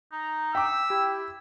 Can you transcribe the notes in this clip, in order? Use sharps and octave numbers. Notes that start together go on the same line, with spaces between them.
D#4 A#5
G5 D6 E6 B6
E4 G4